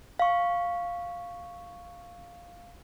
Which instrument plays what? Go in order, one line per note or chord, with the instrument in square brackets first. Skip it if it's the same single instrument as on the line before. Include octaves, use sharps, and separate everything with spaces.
[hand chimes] F5 C#6